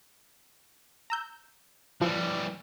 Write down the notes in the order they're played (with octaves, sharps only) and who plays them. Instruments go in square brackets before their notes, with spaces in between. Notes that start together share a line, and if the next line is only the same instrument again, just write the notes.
[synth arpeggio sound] A#5 E6 G6
[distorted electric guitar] E3 G3 [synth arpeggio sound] F3